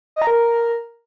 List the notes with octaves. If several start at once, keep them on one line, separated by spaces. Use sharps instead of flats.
D#5
A#5
A#4